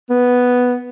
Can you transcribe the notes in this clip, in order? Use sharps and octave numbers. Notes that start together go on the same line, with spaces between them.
B3